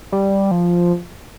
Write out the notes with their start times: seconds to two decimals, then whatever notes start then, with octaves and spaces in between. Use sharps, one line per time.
0.12 G3
0.51 F3